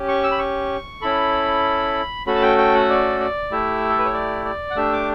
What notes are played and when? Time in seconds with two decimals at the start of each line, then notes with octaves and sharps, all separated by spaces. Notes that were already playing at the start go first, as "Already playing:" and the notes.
Already playing: C#4 G4
0.08 C#6
0.24 E6
0.31 B5
0.39 C#6
1.01 C#4 E4 A4 B5
2.27 A3 C#4 F#4 A4 B5
2.35 A5
2.42 G5
2.58 G5
2.74 F#5
2.90 D5
3.20 D5
3.51 A3 E4 G4 E5
3.90 A4
3.98 B4
4.05 C#5
4.14 D5
4.45 D5
4.71 F#5
4.76 A3 D4 G4 E5
4.92 D6